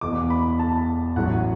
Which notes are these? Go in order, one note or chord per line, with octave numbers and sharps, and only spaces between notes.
E1 E2 B2 D6
B5
A5
A1 A2 F#3 F#5